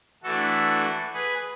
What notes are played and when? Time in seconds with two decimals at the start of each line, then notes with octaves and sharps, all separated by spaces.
0.24 E3 A3 D4 F#4 A4
1.14 G#4 B4